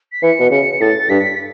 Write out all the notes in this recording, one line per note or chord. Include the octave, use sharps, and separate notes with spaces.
B6
E3 C#7
B2
C#3 C#7
A2 A6
G2 B6